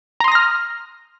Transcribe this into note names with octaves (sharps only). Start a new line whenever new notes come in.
A#5 C6 D#6 F6 A#6